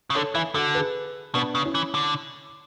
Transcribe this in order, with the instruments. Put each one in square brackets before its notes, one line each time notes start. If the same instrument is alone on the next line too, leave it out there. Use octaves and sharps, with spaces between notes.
[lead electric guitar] C#3
[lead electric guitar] D3 [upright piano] A4 C#5
[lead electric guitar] E3 [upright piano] E5 G#5
[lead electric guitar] D3 [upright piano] F#4 A4
[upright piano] G#4 B4
[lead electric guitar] B2 [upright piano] B3 D4
[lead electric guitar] C#3
[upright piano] C#4 E4
[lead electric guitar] E3
D3